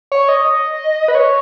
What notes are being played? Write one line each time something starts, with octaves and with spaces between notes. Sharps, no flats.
C#5
D#5
B4
C#5